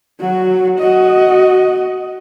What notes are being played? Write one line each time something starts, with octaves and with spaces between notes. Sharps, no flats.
F#3 F#4
F#4 D#5